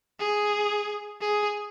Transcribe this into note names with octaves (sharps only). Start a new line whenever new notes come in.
G#4
G#4